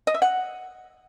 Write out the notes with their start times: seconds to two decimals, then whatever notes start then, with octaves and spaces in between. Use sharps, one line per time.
0.07 D#5
0.14 E5
0.22 F#5